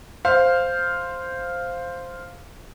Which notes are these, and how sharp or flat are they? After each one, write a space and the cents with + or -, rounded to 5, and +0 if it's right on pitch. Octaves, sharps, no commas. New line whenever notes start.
C5 +0 F5 +0